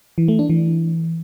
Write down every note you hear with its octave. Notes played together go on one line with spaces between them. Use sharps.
E3
A3
D4
E3